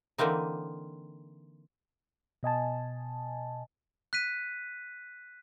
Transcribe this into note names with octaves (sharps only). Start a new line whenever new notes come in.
D3 E3 A#3 C4 D#4
B2 D#5 G#5 A5
F#6 B6 D#7